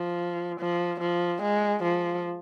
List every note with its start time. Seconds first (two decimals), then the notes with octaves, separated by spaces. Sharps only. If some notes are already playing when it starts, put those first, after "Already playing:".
Already playing: F3
0.60 F3
1.00 F3
1.42 G#3
1.83 F3